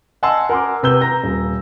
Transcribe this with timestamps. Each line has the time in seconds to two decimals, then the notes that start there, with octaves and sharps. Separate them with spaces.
0.23 D#5 F#5 G#5 A5 C6 E6
0.49 A#4 F#5 G#5 C6 D6
0.83 C3 B4 E6 G6 G7
1.01 A#5 A#6
1.23 D#1